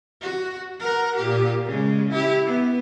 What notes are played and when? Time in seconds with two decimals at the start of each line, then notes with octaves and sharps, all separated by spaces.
0.22 F#4
0.80 A#4 F#5
1.16 A#2 G4
1.66 C#3 G#3
2.11 E4 G4
2.46 B3